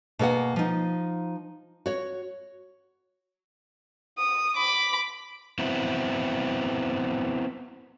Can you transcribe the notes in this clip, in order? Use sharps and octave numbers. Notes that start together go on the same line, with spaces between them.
B2 A#3 G#4 F#5
F3 D#4
F#4 C#5
D#6
B5 D6
B3 C4 E4 F#4